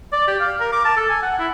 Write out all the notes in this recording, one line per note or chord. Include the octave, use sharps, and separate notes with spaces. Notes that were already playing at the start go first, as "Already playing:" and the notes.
D5
G4
F5
A#4
D6
A5
A4
G#5
F#5
E4